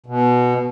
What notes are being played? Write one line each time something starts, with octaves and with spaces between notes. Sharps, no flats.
B2